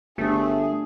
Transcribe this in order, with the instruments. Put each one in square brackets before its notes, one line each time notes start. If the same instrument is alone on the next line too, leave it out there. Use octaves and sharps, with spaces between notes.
[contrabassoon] G1 [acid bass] A3 [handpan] D4 G4 [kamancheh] G#4